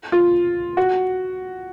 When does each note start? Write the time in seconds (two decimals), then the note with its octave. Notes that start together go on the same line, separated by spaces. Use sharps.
0.12 F4
0.77 F#4